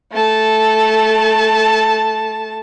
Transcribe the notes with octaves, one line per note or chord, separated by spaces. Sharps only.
A3 A5